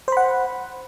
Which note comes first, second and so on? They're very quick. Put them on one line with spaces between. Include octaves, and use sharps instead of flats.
C5 B5 F#5